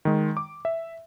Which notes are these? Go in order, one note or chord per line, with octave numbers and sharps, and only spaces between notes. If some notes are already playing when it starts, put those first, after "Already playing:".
D#3 G#3
D6
E5